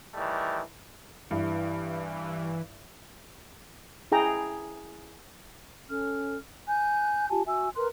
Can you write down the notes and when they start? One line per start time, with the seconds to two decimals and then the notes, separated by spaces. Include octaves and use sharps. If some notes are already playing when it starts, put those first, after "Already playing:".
0.15 D#3 E3 G3 A3
1.31 G2 E3 E4
4.12 E4 G#4 G5 A#5
5.89 C#4 A4 F6
6.67 G#5 F#6 G6
7.29 F4 G4 G#5 A5
7.46 F#4 E5 G#5 E6
7.76 A#4 B4 C6 F#6